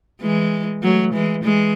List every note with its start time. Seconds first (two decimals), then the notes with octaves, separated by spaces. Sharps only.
0.21 E3 G#3
0.83 F#3 A3
1.13 E3 G#3
1.44 E3 G#3